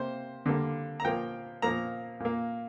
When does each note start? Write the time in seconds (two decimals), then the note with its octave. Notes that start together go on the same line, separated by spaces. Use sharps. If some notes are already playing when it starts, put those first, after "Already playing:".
Already playing: C3 A#3 C5
0.46 D3 G3 A#3
1.00 A#5
1.04 A#2 F3 A#3 G5
1.62 A#2 F3 A#3 A#5
2.20 A#2 A#3